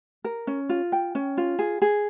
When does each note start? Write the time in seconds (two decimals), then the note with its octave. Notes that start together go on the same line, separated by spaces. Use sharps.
0.24 A#4
0.47 C#4
0.69 F4
0.92 G5
1.15 C#4
1.37 F4
1.59 G#4
1.82 G#4